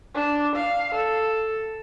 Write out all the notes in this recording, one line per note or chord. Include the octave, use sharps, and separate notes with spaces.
D4
F5
A4